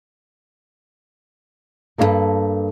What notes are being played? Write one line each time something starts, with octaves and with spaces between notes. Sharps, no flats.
G2 A#3 D4 F4 A4 B4